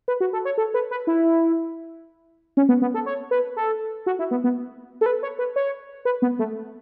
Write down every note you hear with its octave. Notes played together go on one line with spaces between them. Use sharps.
B4
F#4
A4
C#5
A4
B4
B4
E4
C#4
B3
B3
A4
C#5
B4
A4
F#4
E4
B3
B3
A4
B4
C#5
B4
C#5
B4
B3
A3